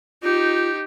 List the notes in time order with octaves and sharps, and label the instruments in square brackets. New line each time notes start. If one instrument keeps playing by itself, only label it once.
[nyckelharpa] D#4 G4 [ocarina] F4